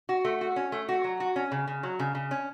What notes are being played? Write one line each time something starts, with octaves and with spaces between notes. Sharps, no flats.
F#4
A3
F#4
C#4
A3
F#4
F#3
F#4
C#4
C#3
C#3
F#3
C#3
C#3
C#4